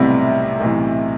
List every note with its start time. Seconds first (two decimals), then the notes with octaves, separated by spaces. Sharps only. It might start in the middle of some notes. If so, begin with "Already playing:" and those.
Already playing: B1 A2 C3 G3 B3 E4
0.60 B1 A2 E3